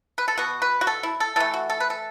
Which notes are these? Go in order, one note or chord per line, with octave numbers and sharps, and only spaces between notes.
B4
A4
B2 B3 F#4
B4
F#4
A4
E4
A4
E3 A3 A4
F#4
A4
B4
A4